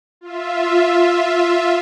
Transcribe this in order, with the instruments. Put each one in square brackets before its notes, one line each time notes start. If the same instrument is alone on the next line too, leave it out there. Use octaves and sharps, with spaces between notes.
[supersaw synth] F4 E5